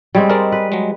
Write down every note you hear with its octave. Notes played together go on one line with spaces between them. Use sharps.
G3 G#3 C4 C#5 G#5
G#3 C4 A#4 D5
B4
F#3 G#3